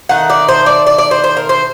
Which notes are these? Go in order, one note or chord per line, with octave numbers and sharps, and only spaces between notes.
D#3 A3 D#4 F#5
D5
C5
D5
D5
D5
C5
C5
A#4
C5